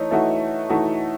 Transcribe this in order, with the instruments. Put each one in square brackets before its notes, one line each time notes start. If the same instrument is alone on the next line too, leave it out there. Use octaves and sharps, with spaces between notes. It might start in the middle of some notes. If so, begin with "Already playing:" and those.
Already playing: [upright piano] E3 A3 D#4 [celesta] C#5 D#5
[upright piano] E3 A3 D#4 F#4 [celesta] E5
[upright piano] E3 A3 D#4 F#4